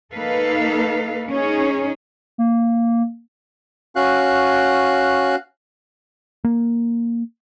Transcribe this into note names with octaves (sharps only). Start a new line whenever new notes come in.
A#3 D#4 A4 B4 F5
C#4 D#4 G#4 C#5
A#3
C#4 F#4 F5 F#6
A#3